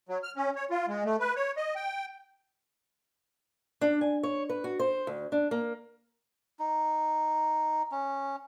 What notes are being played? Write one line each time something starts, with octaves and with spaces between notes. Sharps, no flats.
F#3
F6
C#4
C#5
F4
G#3
A3
B4
C#5
D#5
G5
D4
G#5
C#5
B4
F#4
C5
D2
D4
A#3
D#4
C#4